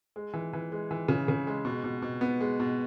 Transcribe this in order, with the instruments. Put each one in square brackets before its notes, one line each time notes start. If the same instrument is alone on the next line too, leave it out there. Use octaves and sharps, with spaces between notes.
[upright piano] G#3
E3
E3
G#3
E3
C#3
C#3
G#3
B2
B2
B2
B3
G#3
B2